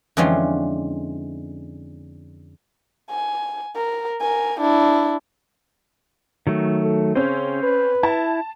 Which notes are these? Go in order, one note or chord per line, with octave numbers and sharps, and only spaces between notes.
F2 D3 E3 G#3 C#4 F4
G#5
A#4
A#4 G#5
D4 E4
D#3 F#3 A3
A4
C#3 C4 C#4 C5
B4
E4 A5